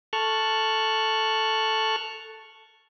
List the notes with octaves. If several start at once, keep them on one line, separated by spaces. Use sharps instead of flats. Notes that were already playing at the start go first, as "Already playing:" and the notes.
A4 A5 C#6 F6 F#6